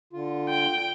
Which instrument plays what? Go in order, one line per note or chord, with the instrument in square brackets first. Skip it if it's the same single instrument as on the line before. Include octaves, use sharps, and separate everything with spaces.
[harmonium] D3 F4
[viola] G5